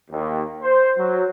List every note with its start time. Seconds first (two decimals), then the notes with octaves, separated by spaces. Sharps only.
0.10 D#2
0.61 C5
0.97 F#3